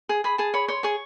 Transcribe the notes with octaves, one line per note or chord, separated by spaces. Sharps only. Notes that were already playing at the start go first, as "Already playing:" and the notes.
G#4
G#4 B5
G#4 A5
C#5 B5
C#5 C6
G#4 C#6